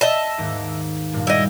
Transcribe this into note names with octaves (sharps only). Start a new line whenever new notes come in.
D#5 E5 A5
D#2 G#2
G2 A#2
G3 E4 G4 D#5